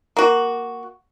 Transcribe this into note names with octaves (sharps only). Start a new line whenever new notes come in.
A#3 F#4